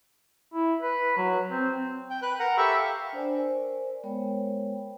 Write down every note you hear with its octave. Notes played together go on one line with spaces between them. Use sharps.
E4
B4
F#3
C4
G5
B4 F#6
A#4 F#5 A#5
G4 A4 E5 B5 C#6
F5
D4 C5 D5 G#5
A#4 C5 D5 G#5
G#3 B3 A#4 C5 C#5 G5